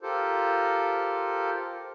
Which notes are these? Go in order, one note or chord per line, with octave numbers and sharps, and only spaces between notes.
F4 G4 A4 A#4 C5